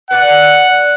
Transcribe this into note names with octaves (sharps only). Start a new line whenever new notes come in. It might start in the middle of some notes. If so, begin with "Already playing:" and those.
B4 D5 F#5 G#5